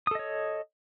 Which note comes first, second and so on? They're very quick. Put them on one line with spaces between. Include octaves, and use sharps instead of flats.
D#6 A4 D#5 C#5